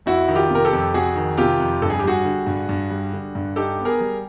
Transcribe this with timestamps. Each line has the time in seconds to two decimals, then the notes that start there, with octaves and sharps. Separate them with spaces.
0.06 F2 E4 F#4
0.28 D#3
0.35 F4 G4
0.51 C3 A#4
0.65 G4 A4
0.73 F2
0.94 F2 F#4 G#4
1.16 D#3
1.37 C3 F4 G4
1.60 F2
1.82 G2 A4
1.90 G#4
1.99 G4
2.04 G3 F#4 G#4
2.25 D3
2.47 G2
2.69 G2
2.90 G3
3.13 D3
3.35 G2
3.56 D#4 G4 A4
3.79 B3
3.85 G#4 A#4
4.01 G3